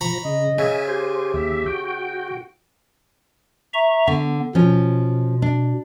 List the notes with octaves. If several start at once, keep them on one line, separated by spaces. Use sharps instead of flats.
F3 A#5 B5 C#6 A#6
C#3 D#5
C#3 E5 G#5
G4 C5 G#5
D#2 E5
F#4 G5
E5 A#5 C#6
D3 B3
B2 F3 C#4
D4